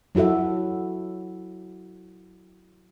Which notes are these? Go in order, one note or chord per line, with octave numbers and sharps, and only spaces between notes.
F#3 E4 F#4 A4 E5